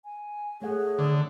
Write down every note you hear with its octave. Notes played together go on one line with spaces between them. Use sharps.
G#5
A3 G#4 A4 C#5 F#5
D3
D#3 D4